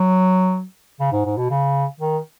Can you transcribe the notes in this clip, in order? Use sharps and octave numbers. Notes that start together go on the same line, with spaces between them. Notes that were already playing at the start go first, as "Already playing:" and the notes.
Already playing: F#3
C#3
G#2
G#2
B2
C#3
D#3